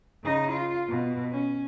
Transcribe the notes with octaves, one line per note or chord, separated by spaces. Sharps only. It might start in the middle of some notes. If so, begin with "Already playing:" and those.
C#3 D#4
F4
B2
C#4